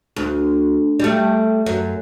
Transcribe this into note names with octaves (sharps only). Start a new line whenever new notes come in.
D2
G3 A3
F#2